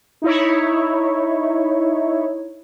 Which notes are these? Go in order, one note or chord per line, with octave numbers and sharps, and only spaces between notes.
D#4 E4 C#5